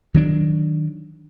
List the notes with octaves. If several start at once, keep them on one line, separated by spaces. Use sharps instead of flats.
D#3 F#3 D4